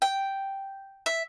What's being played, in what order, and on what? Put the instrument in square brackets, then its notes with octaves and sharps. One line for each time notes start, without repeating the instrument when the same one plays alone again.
[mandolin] G5
E5